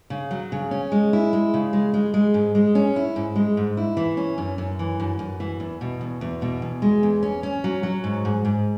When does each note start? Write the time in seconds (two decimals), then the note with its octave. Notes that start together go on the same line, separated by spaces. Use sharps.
0.10 C#3
0.31 F#3
0.52 C#3
0.71 C#4
0.92 G#3
1.13 E4
1.33 G#3
1.54 C#3
1.73 G#3
1.94 G#3
2.14 G#3
2.34 G#2
2.55 G#3
2.75 C#4
2.96 E4
3.16 G#2
3.36 G#3
3.57 G#2
3.77 E4
3.97 E3
4.17 C#4
4.38 F#2
4.58 F#2
4.79 E3
5.00 F#2
5.19 F#2
5.40 E3
5.60 E2
5.81 B2
6.01 E2
6.21 E2
6.42 B2
6.62 E2
6.82 G#3
7.03 E2
7.23 C#4
7.43 C#4
7.64 F#3
7.83 F#3
8.04 G#2
8.25 G#2
8.45 G#2